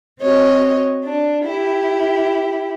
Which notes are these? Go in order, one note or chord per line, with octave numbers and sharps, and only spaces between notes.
C4 F#4 C#5 D#5
D4
E4 G4